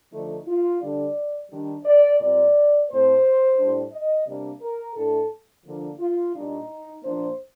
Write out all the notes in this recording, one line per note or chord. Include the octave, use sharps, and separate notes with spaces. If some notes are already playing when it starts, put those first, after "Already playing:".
D3 F3 A3 D4 D#4
F4
D3 G3 D4 D5
D#3 G3 D4
D5
A#2 G3 C4 D5
A2 A3 C4 C5
A2 G3 D4
D#5
C3 G3 A#3 D4
A#4
A2 A3 D4 A4
D3 F3 A#3 D4
F4
A#2 G3 D4 D#4
A#2 F3 A#3 D4 C5